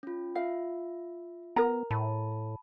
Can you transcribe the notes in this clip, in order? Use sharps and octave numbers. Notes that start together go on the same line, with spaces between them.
C#4 F4
F4 E5 F5
B3 A#4 A#5
A2 A5 B5